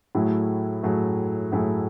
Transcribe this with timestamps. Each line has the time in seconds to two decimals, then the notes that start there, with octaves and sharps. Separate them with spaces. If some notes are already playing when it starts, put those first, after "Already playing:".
0.15 A2 F#3 A3 E4 G#4
0.83 A2 F#3 A3 E4 G#4
1.52 A2 F#3 A3 E4 G#4